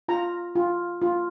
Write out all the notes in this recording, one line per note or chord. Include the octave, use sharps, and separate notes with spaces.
F4 A#5
F4
F4